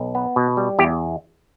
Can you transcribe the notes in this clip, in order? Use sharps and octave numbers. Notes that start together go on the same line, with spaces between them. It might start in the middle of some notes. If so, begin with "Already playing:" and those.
Already playing: B1
B3
B2
G3
E2 G4